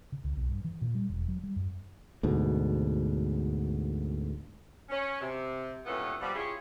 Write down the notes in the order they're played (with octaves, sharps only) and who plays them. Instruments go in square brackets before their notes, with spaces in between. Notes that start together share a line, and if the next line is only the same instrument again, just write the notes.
[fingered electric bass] C#3
C#2
B1
G2
E3
A#2
G3
E1
F#3
G3
F#2
D2 G#2 B2
[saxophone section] C#4
C3
G2 A#2 E3 B3 C#4 A4
B2 F3 G3
C#4 E4 F4 G4 G#4 C#5